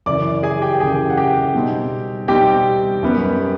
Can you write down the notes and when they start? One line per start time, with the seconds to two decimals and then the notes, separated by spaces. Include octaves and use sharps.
0.06 F#2 C#3 E3 D5 D6
0.43 G#4 G#5
0.62 G4 G5
0.75 G5
0.80 F#2 C#3 E3 G#4 G#5
1.10 F#5
1.17 G4 G5
1.54 B2 G3 C4 D#4
2.28 B2 G3 C4 D#4 G4 G5
3.03 F#2 D#3 G3 B3